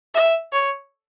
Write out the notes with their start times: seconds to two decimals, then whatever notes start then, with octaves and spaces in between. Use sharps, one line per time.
0.15 E5
0.53 C#5